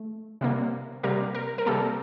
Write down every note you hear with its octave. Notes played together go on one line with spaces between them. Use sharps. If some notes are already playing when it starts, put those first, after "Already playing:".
Already playing: A3
C3 G3 A#3
C3 G3 A#3 A#4
A#4
A#4
C3 G3 A#3 A4